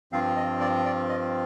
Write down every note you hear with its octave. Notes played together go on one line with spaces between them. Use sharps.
G2 F3 C4 F4 F5
D#5
D5
D5
D#5